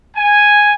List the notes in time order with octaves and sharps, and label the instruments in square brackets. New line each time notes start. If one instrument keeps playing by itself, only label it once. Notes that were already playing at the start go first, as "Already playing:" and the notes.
[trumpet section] G#5